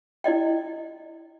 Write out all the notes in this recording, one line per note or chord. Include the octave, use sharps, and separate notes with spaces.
E4 D5 D#5 G5